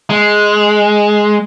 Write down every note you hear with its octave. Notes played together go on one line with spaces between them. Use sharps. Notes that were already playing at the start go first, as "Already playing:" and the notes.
G#3